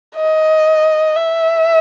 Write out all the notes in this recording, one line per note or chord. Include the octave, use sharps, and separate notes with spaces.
D#5
E5